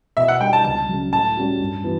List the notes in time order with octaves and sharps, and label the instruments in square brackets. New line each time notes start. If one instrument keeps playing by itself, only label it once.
[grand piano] B2 [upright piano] E5
[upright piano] F#5
[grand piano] G3 D4 [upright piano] G5
[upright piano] A5
[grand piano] C#2 [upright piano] A5
[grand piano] C#3 F#3
[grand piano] A2 [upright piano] A5
[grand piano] G3 C#4 F#4
G2
E3 B3 F#4